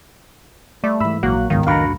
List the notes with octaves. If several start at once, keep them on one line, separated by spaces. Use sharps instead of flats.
G3 A3 D5
G#2 E3 B5 E6
A#1 F#3 A#3 F#4 F#6
F#1 C#2 G#2 D#3 B3 F5
C#2 F#2 A2 D4 F#4 F5 A#5 B5